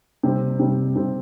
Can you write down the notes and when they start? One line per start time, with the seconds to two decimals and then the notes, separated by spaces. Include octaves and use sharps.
0.23 C3 G3 C4
0.59 C3 G3 C4
0.96 C3 G3 C4